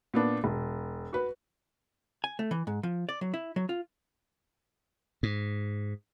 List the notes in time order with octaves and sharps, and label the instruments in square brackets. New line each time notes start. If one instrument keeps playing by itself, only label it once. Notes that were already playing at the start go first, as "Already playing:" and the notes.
[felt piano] A#2 B3 D4
E1
F#4 B4
[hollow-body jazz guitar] G#5
A3
E3
G#2
F3
D5
F#3
E4
F#3
F4
[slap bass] G#2